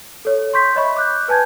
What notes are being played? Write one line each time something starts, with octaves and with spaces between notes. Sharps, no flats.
A4 C#5
C6 C#6 G6 B6
C#5 D#5 E5 B5 C#6
D6 F#6 G6
B4 G#5 A5 G6 G#6